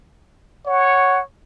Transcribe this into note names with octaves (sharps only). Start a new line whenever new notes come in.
C#5 F#5